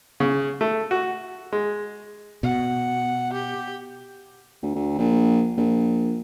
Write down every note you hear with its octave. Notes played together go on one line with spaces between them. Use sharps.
C#3
A3
F#4
G#3
B2 F#5
G4
D2
D2
A#1
A#1